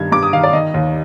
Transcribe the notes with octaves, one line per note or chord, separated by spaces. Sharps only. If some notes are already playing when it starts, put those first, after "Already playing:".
Already playing: G2 D#3 G#6
G2 D6
D#6
D#3 F5
D5
D#3 D#5
D#2